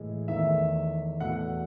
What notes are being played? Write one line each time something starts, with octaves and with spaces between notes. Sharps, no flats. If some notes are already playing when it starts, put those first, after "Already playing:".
Already playing: A2 E3 G#3
E2 D#3 A3 E5
E2 B2 A3 F#5